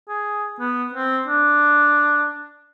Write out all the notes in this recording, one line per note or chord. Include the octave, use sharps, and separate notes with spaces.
G#4
B3
C4
D4